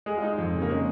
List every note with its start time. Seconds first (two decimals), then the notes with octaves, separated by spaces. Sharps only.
0.06 G#3 G#4
0.17 F4
0.23 D#4
0.39 F2
0.55 C#3
0.62 A#3
0.70 G#3 C#4